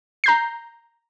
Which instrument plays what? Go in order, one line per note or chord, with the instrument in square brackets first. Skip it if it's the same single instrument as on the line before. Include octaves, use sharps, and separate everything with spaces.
[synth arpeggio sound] A#5 G6 C7